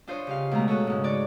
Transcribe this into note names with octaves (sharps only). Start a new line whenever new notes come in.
D4 F4 C5 C#5 D#5
C#3 G4 F5
B2 G#3 A3 A#5
F#4 G#4 A4 C#5
G#2 C#3
D#4 F#4 C#5 D5